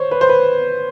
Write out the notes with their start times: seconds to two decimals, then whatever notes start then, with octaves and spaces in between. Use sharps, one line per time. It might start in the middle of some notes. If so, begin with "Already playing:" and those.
Already playing: C5 C#5
0.11 B4
0.21 C5
0.29 B4